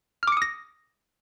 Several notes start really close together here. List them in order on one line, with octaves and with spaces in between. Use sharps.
F6 D6 C#7 D#6 A#6